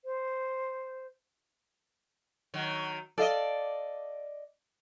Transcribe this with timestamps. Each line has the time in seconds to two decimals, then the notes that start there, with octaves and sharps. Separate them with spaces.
0.05 C5
2.54 D#3 F#3
3.18 A4 D5 D#5 F5